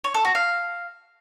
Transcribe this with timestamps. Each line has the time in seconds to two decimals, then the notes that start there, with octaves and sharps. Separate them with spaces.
0.04 C#5
0.14 A4
0.25 F#4
0.35 F5